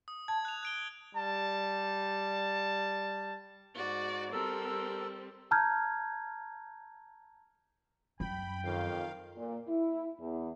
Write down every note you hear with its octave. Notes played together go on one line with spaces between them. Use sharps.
D#6
A5 G#6
F#6 F7
F#6 D7 G7
G3 A5
G#2 F#4 D5
G3 C4 A4 A#4 E6
A5 A#5 F6 G6 G#6
F#2 G5 B5
F2 D#3 F5
A#2
E4
E2